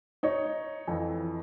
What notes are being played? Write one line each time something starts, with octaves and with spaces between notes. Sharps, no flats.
D#4 C#5
F2 E3